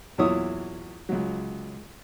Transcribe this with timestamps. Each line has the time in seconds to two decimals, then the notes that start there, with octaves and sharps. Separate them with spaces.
0.18 E2 A#2 F#3 E4 C#5 D#6
1.09 C#2 F#3